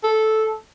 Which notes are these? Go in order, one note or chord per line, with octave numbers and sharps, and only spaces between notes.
A4